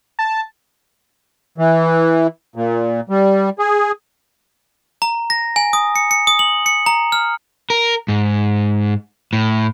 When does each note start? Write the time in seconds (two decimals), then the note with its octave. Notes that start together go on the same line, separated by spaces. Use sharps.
0.19 A5
1.58 E3
2.56 A#2
3.09 G3
3.59 G#4
5.02 A#5
5.30 A#6
5.56 G#5
5.73 D#6
5.96 C#7
6.11 C#7
6.27 D#6
6.39 F#7
6.66 C#7
6.86 A#5
7.12 F6
7.70 A#4
8.08 G#2
9.33 A2